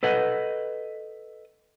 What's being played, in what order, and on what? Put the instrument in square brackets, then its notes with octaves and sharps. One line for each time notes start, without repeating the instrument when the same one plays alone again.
[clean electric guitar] A4 B4 D#5 F#5